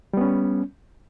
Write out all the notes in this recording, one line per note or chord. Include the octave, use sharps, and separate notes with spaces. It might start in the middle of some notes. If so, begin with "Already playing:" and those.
G3 B3 C#4